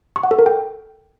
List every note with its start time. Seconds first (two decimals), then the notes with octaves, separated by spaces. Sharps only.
0.16 C#6
0.23 F#5
0.31 A4
0.39 A#4
0.46 G5